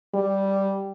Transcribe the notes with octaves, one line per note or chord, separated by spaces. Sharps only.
G3